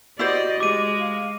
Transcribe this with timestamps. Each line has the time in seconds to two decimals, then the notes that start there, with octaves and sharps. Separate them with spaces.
0.19 E4 F#4 G4 C5 D5 D#5
0.60 G#3 G4 D6 D#7
0.99 F5